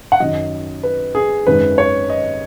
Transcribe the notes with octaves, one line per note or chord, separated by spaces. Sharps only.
F#5
F#2 D#3 F#3 D#5
B4
G#4
G#1 F#2 D#3 G#3 B4
C#5
D#5